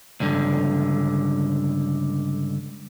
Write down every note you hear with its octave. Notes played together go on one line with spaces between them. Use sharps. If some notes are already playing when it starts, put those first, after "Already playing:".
C#2 G2 D3